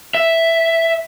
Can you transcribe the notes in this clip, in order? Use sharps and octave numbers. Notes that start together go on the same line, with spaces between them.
E5